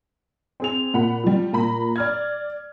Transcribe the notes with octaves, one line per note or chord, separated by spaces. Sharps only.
C4 G#4 F7
A#2 F#5 B5
F3 G3
A#2 A#5 B5
D5 F6 G#6